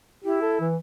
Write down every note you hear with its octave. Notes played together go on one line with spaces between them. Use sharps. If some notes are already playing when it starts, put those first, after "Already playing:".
E4 G4
A4
E3